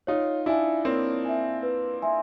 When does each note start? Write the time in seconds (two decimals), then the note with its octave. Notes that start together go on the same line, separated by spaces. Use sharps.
0.07 D#4 F4 C#5
0.46 D4 E4 E5 G#5
0.85 A#3 C4 C#5
1.25 E5 G#5
1.63 B4
2.02 E5 G#5 C6